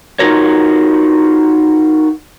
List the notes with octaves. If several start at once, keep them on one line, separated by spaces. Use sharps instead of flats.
D#4 F4 F#4 A#4 C#5